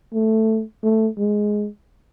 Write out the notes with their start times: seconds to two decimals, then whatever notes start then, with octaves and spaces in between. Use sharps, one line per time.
0.14 A3
0.84 A3
1.18 G#3